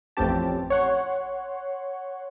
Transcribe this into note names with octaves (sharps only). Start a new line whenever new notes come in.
A1 F2 C4 C#4 G4 A5
C#5 F#5 C6